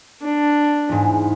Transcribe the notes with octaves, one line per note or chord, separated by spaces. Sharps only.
D4
E2 G#2